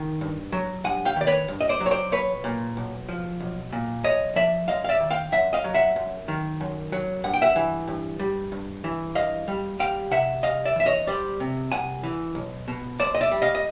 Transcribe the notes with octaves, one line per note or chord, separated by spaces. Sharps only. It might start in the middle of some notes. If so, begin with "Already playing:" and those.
Already playing: D#3
G2
F#3
G2 F#5 G#5
F5 G5
D#3 D5
B4 C#5
G2
D#5
C5 D5
F#3
C#5
C5 D5
B1 B4 C#5
A#2
B1
F3
B1
A#2
B1 C#5 D#5
F3 D5 E5
F#2 D#5 F5
F5
D5 E5
D#3
F5 G5
F#2 E5 F#5
D#5 F5
F#3
E5 F#5
F#2
D#3
F#2
F#3
G2 F#5
G5
E5 F#5
E3
G2
G3
G2
E3
G2 D#5 F5
G3
G3 F5 G5
C3 E5 F#5
C2 D#5 F5
D5 E5
E3 E5
C#5 D#5
G3 C5 D5
C3
C2 F#5 G#5
E3
B1
B2
B1 C5 D5
D#5
D5 E5
G3
D#5 F5
D#5